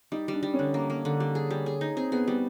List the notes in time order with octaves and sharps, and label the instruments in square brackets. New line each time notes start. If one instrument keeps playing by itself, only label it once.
[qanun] G3 [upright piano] D#4
[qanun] G3 [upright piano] D4
[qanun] G3
[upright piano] C#4
[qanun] D3
A#3
A#3
D3
G3
G#4
G3
G#4
D#4
[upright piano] C4 [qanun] G#4
[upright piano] B3 [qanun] G#4
[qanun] G3 [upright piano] B3